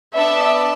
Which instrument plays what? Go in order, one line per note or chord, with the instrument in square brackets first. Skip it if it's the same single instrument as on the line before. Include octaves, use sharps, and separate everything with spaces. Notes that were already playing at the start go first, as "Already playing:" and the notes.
[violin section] B3 D4 A4 D5 A5 [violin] E5